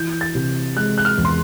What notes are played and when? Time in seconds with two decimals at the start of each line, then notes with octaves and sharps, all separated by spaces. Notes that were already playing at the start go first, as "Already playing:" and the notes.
Already playing: E3 G6
0.21 A6
0.35 C3
0.77 G#3 F#6
0.98 F#6
1.05 F6
1.18 E2
1.25 C6